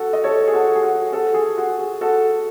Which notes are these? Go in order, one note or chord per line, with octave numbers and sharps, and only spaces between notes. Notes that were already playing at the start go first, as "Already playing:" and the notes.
Already playing: F#4 A4
D#5
A4 C#5
G#4
F#4 A4
G#4
F#4
F#4 A4
G#4
F#4
G#4
F#4 A4